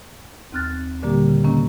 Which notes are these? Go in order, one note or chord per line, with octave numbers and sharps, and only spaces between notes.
D#2 C4 F6 F#6 A6
A#2 D3 G3 A#3 G4
C#3
C3 D#3 A#3 C#4